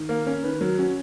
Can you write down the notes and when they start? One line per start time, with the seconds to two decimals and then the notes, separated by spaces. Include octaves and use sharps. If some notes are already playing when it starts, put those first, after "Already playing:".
Already playing: D#3
0.09 A#3 A#4
0.26 C#4 A#4
0.44 D#3 B4
0.61 F#3 A#4
0.78 C#4 F#4